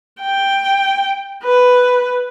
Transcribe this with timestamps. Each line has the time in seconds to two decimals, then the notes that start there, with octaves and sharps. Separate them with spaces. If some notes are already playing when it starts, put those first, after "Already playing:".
0.21 G5
1.44 B4